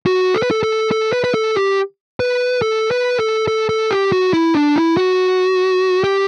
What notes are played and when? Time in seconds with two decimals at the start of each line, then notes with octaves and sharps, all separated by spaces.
0.06 F#4
0.34 A4
0.42 B4
0.51 A4
0.63 A4
0.91 A4
1.13 B4
1.24 B4
1.34 A4
1.56 G4
2.20 B4
2.62 A4
2.91 B4
3.19 A4
3.48 A4
3.69 A4
3.91 G4
4.12 F#4
4.33 E4
4.55 D4
4.76 E4
4.97 F#4
6.04 G4